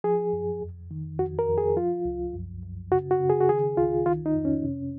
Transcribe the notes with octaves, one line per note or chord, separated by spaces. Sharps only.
F3 G#4
F#2
F2
D#3
F2 F#4
A#4
F2
G#4
F3 F4
C2
F#2
F#2
C#3 F#4
F#4
C#3
G#4
F#4
D#3 G#4
C#2 F4
D#3 F4
D#4
F2
C#4
C3